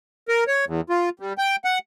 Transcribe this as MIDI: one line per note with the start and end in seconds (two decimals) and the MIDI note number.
0.28 0.44 70
0.47 0.65 73
0.67 0.81 40
0.90 1.09 65
1.20 1.33 55
1.38 1.56 79
1.64 1.79 78